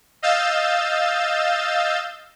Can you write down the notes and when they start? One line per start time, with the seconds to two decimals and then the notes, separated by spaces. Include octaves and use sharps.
0.22 D#5 F5 E6 G6 A6